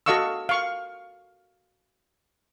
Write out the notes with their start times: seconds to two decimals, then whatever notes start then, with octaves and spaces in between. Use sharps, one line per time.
0.06 F#4 A4 D#5 F5 C#6 E6
0.49 F5 C#6